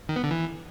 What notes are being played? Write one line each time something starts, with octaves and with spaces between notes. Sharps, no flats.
D#3
B3
D3
E3